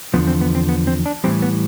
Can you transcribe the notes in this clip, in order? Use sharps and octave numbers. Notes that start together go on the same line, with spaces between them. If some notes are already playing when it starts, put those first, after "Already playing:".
E2 D3 F3 B3
C4
B3
C4
B3
C4
D4
A2 E3 G3 C4
B3